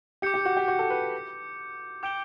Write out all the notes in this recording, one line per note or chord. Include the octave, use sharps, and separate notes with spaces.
G4 D6 G6 C#7
G4
F#4
G4
F#4
A4
B4
G5 D6 G6 D7 G7